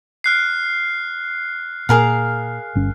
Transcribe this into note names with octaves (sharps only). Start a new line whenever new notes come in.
F6 F#6 C7
A#2 G#4 A#4 F5
G1 C#4